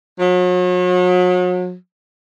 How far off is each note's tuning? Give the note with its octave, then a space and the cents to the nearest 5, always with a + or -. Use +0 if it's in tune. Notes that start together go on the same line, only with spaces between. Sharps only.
F#3 -40